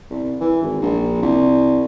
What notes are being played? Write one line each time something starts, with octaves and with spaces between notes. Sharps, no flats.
C2
E3
G#1
A#1
C2